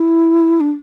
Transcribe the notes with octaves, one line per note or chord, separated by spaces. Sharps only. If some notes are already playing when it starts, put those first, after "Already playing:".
Already playing: E4
D4